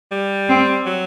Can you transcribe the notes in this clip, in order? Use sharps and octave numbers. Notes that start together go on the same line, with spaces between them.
G3
C4
F#3